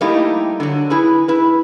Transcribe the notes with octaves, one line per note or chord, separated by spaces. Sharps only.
G3 A3 A#3 D#4 E4 G4
D3 F#3
E4 G#4 B4
E4 B4